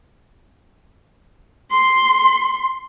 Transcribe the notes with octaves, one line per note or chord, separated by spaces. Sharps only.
C6